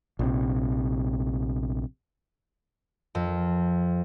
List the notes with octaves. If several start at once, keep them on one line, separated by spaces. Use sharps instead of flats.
A#1 C3
F2